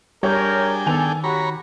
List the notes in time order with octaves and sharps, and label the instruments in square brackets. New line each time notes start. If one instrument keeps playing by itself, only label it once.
[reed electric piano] G3 G6 [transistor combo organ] D4 G#4 G5 [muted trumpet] A#4 [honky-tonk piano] C#5
[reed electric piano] D#3 [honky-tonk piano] B3 G#5 F7 [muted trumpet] A4
[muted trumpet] F#4 [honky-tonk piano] G4 [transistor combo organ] C#5 A#5 B5